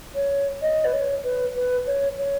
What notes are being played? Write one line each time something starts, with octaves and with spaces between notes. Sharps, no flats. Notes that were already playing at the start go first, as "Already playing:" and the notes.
C#5
D#5
B4
C#5
B4
B4
C#5
C#5